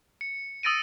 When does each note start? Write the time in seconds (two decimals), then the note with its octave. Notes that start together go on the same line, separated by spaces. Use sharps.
0.21 C#7
0.63 D#6 E6 A6 A#6 D7 D#7